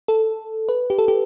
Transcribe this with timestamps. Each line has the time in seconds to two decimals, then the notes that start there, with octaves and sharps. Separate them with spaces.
0.08 A4
0.69 B4
0.90 G4
0.99 A4
1.08 G4